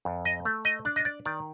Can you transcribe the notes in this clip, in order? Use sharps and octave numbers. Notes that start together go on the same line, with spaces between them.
F2
D#5
A3
D#5
D4 D5
D#5
D5
D#3 D5